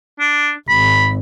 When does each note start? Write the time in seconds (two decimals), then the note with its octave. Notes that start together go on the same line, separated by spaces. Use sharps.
0.20 D4
0.69 G#1 B5